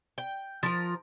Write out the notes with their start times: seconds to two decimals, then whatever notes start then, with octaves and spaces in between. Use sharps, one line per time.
0.18 G5
0.63 F3 A#4